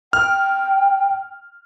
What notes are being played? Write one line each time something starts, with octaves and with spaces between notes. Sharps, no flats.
G5 F6